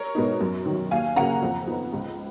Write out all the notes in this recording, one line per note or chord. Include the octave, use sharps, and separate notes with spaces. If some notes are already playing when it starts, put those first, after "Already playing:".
Already playing: A#4 C#5
B2 G#3 B3 D#4
F#2
D#3 F#3
D#2 F5 G#5
C#3 F#3 A#3 C#4 F#5 A#5
F2
F3 B3 D#4
C#2